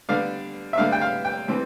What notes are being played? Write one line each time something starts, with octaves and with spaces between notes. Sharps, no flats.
D3 G3 B3 D4 F5
E5
D3 G3 B3 D4 F5
G5
F5
G5
E3 G3 C4